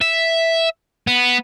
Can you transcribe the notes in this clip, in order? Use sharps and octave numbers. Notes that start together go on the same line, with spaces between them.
E5
B3